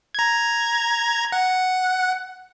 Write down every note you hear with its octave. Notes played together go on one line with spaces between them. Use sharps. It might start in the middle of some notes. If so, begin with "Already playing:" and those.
A#5 G#6
F#5